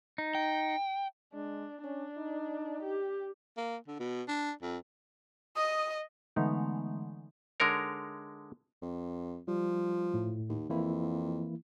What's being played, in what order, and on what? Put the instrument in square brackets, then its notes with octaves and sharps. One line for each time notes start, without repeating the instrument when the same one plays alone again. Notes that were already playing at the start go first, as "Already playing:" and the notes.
[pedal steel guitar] D#4
[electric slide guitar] G5
[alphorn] G#3 [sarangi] D4
[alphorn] C#4 [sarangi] D4
[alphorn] D#4
[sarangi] G4
[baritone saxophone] A#3
D3
B2
D4
F2
[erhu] D#5 [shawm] D#6
[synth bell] D3 E3 G#3 A3 B3 D#4
[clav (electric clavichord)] D3 G#3 D#4 A#4 C#5
[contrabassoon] F2
[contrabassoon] F3 [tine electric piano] G3
[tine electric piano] A2
[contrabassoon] D#2
[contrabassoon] F2 [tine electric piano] E3 A#3 E4